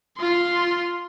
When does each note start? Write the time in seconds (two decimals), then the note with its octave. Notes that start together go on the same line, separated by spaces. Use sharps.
0.17 F4 C6